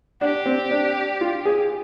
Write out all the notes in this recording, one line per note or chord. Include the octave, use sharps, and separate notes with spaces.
D4 G4
C4
D4
F4
G#4